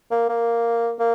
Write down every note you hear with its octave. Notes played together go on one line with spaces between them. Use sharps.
A#3
A#3
A#3